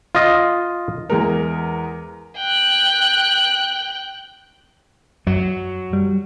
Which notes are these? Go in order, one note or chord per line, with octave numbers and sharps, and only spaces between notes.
F4 D#5
E2 G#3 A#4
G5 F#6
F#2 F#3
G3